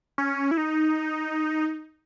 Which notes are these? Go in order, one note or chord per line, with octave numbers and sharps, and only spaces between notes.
C#4
E4
D#4